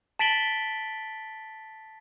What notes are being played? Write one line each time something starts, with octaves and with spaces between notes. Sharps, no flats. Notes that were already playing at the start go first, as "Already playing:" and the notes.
A5 A6 B6 D7 F#7 G7